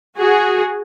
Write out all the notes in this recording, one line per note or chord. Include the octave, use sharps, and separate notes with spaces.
F#4 G#4